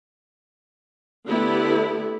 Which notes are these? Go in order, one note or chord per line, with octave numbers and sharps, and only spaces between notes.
D3 A3 B3 E4 G4